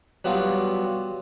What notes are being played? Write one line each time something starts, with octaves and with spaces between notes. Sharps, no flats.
F#3 G3 B3 F4